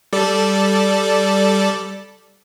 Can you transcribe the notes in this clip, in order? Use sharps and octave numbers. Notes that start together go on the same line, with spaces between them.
G3 A4 D5